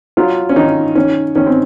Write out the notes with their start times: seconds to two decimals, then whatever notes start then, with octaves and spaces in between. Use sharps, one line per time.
0.17 F#3 F4
0.49 C#4
0.56 D#3 D#4
0.95 D#3 C#4
1.35 D#3 C#4
1.47 C4